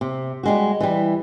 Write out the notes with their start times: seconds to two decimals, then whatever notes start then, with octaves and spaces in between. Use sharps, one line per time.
0.01 C3
0.43 G3 G#3 F#4
0.80 E3 G3